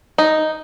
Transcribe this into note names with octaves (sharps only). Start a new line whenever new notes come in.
D#4